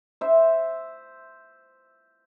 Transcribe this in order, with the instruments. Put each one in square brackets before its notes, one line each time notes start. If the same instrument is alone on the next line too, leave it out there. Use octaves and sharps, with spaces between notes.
[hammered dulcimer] C5 E5